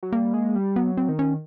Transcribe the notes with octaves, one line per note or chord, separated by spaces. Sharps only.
F#3
G3 A#3
G#3
G3
F#3 B3
C4
D#3
C#4